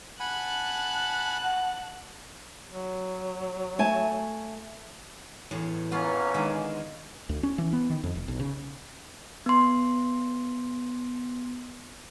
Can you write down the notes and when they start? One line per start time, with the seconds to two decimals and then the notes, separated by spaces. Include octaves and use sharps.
0.20 F#5 G#5 A5 B5 F#6
1.43 F#5
2.69 F#3
3.79 A3 G#5 A5
5.51 E2 A2 C#5
5.91 B1 A#3 B3 C#4 F4 F5
6.34 D3 D#3 G#3
7.29 D2
7.43 C#4
7.58 E3
7.73 B3
7.90 D#3
8.04 F2
8.15 F1
8.28 B1
8.40 C#3
9.46 B3 C6